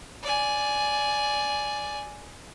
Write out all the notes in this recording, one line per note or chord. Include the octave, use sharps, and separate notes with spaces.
D5 G#5